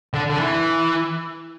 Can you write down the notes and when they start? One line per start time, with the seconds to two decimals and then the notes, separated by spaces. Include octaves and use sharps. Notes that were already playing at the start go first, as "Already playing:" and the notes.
0.14 D3
0.30 D3
0.40 E3